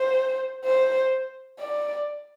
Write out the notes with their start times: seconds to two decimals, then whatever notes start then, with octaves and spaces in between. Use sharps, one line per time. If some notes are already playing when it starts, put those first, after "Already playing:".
Already playing: C5
0.65 C5
1.60 D5